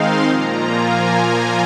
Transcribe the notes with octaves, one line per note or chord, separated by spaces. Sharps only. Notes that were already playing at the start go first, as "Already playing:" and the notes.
Already playing: D#3 G#3 C4 D#4 F5 C6
A#2 F3 A#3 F4 A#5
G#5